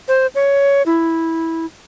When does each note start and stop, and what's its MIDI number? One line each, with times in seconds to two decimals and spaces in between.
0.08 0.27 72
0.35 0.82 73
0.86 1.66 64